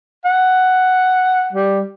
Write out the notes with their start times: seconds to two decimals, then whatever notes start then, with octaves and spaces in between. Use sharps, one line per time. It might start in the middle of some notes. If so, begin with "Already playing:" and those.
0.25 F#5
1.53 G3